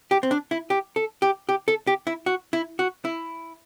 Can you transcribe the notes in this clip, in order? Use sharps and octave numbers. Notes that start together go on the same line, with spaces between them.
G4
C4
D4
E4
G4
A4
G4
G4
A4
G4
E4
F#4
E4
F#4
E4